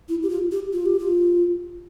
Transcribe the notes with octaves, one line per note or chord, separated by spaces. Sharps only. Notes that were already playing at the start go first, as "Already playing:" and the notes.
E4
G4
F4
G4
F4
G4
F4